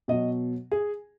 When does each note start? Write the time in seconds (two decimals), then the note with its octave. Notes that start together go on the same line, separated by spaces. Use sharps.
0.08 B2 F#3 D#5
0.72 G#4